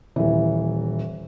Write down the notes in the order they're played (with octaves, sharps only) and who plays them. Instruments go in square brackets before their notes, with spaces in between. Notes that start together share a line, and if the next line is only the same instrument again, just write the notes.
[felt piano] D#1 E3